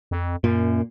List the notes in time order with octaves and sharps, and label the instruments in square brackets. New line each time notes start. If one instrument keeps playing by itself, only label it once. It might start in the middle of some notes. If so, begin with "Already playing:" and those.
[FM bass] F2
[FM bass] F#2 [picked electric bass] A#2